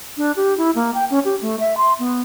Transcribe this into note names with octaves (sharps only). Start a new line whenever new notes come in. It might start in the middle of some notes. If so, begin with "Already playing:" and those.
D4
G4
E4
A#3
G5
C#4
G4
A3
E5
C6
B3